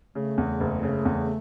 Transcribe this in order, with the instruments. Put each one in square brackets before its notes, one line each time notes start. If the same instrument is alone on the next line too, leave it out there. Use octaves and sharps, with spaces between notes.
[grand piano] C#3 [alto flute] A3
[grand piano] E2
F#1
C#3
E2